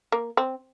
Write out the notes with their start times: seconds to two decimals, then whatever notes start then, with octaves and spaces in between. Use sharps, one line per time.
0.12 A#3
0.37 C4